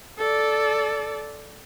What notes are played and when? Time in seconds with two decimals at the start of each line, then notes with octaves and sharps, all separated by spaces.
0.18 A4 D5